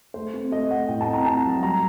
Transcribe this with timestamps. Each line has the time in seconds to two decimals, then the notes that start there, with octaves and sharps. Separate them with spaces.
0.14 A3 C5
0.33 C4
0.52 A3 D#5
0.71 A3 F#5
0.88 A2 G5
1.01 A5
1.07 C4
1.13 A#5
1.26 C4 A5
1.44 F#3
1.62 G3 A#5